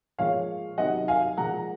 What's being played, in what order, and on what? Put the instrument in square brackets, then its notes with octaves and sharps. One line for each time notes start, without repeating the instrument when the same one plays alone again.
[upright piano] A#2 F3 G#3 C#5 F5
C3 D#3 F#3 D#5 F#5
F5 G#5
A#2 F3 G#3 F#5 A#5